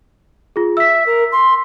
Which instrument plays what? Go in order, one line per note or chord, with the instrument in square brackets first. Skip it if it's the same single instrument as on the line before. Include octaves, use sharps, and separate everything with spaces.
[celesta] F4 G#4
[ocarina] E5 [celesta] E6 B6
[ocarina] A#4
C6